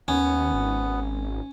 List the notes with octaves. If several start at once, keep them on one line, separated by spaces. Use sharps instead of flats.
D#2 B3 C#4
G#1